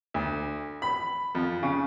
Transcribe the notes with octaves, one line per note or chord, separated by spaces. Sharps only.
D2
B5
F2
C#3